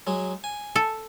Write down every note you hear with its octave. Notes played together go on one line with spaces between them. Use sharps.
F#3 G#3
G#5
A4